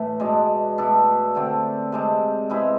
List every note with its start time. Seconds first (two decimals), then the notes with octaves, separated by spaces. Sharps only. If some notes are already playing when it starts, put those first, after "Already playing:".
Already playing: A2 E3 A3
0.20 B2 G#3 D4
0.78 B2 A3 D4 A4
1.35 D3 A3 C4
1.92 C3 G#3 D4
2.50 C3 G#3 B3 E4